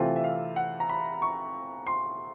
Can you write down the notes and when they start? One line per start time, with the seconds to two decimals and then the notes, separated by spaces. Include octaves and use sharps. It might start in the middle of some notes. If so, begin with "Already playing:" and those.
Already playing: C3 E3 A3 C4 F4 E5
0.16 E5
0.24 F5
0.56 F#5
0.80 A#5
0.89 B5
1.22 C#6
1.87 C6